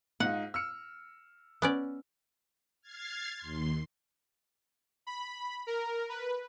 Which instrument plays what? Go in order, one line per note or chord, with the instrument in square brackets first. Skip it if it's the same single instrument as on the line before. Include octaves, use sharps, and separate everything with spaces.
[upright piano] G#2 D#4 F4 [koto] F#5
[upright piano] E6 F6 C#7
[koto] B3 C#4 D5
[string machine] F6 G#6 A6 C7
D#2 C6
[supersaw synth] B5
A#4
B4